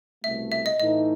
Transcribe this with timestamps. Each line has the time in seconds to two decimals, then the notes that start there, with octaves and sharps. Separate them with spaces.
0.24 C2 B2 A3 E5
0.52 E5
0.66 D#5
0.80 A2 E3 A3 D#4 D#5